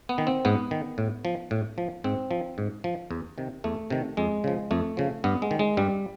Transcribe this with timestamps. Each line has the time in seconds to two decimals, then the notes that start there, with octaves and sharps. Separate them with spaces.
0.09 B3
0.18 D#3
0.27 C4
0.45 G#2 B3
0.71 D#3
0.98 A2
1.25 F3
1.51 A2
1.78 F3
2.04 G#2 C4
2.31 F3
2.58 G#2
2.84 F3
3.11 E2
3.38 C3 D#3
3.64 E2 A3
3.90 C3 D#3
4.17 F2 G#3
4.44 C#3 F3
4.71 F2 A3
4.97 C#3 F3
5.24 G2 B3
5.42 G#3
5.51 D#3
5.59 G#3
5.77 G2 G3